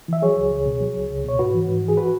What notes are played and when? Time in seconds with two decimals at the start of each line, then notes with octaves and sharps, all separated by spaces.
0.08 E3 E5
0.22 F#3 G#4 C#5
0.36 C#2
0.51 C#2
0.66 B2
0.81 F#3
0.96 C#2
1.10 C#2
1.24 B2 C#5
1.39 G#2 F#4 B4
1.54 E3
1.68 G#2
1.83 E3
1.88 G#4
1.97 F#4 B4